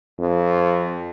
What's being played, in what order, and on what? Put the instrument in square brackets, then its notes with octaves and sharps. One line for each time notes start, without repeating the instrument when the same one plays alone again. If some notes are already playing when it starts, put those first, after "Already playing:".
[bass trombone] F2